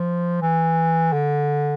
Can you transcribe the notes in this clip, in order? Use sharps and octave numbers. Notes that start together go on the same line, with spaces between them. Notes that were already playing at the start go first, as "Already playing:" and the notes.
Already playing: F3
E3
D3